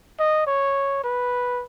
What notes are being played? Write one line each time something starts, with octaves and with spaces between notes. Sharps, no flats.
D#5
C#5
B4